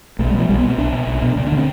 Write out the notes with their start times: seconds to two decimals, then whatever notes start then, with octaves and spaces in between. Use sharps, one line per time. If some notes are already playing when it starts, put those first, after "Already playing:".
0.19 B1 A3
0.30 G3
0.34 B2 F3
0.49 B1 G3
0.59 B3
0.63 B2
0.69 C4
0.78 B1 D4
0.92 B2
1.07 B1
1.22 B2
1.36 D2 D4
1.47 D4
1.52 D3
1.57 C4